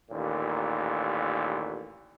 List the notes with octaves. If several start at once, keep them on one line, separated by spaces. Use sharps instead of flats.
A1 D#2 A#2